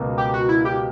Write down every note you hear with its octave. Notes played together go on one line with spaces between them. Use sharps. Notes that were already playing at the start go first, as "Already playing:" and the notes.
Already playing: C#2 B2 F#3 A#3
G4
F#4
E4
G4